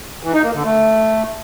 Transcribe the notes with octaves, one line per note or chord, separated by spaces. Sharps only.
E3
D#4
A#3
D3
A3